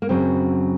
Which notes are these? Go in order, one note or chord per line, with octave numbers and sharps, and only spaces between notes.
A#3
F#2 C#3 F#3 C4